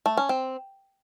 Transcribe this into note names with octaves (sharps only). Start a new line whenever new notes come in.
A3
C#4
C4